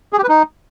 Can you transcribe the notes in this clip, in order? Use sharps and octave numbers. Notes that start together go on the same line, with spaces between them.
G#4
G4
B4
D#4